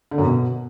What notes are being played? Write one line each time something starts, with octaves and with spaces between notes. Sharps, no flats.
D3
F#2
B2